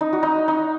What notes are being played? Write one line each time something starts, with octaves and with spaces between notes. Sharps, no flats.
D#4
F#4
D#4
D#4